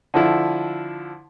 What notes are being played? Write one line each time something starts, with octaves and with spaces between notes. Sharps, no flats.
D3 F3 E4